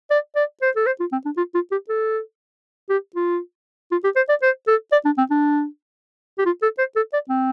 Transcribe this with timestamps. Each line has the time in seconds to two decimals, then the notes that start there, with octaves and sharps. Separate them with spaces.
0.11 D5
0.36 D5
0.62 C5
0.76 A4
0.86 C5
1.00 F4
1.12 C4
1.25 D4
1.37 F4
1.55 F4
1.72 G4
1.89 A4
2.89 G4
3.16 F4
3.92 F4
4.04 G4
4.16 C5
4.29 D5
4.42 C5
4.67 A4
4.92 D5
5.05 D4
5.18 C4
5.30 D4
6.39 G4
6.46 F4
6.62 A4
6.78 C5
6.96 A4
7.13 D5
7.29 C4